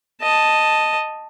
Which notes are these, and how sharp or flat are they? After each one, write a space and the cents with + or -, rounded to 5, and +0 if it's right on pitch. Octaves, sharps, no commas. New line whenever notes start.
D#5 +0 A5 +0